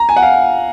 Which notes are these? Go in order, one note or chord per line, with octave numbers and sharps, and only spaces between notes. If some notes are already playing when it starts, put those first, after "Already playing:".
Already playing: A#5
G#5
F#5
F5